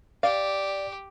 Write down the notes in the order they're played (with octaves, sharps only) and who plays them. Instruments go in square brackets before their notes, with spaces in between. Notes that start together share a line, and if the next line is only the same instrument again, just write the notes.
[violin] G4 [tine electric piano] D5 [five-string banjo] F5